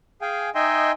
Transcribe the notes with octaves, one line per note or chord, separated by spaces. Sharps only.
G#4 F5 G5 G#5
D#4 D#5 E5 G5 G#5 C6